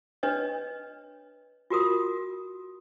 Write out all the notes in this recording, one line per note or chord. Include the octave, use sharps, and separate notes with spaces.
D4 B4 C#5 D#5
F4 F#4 A#4 D#6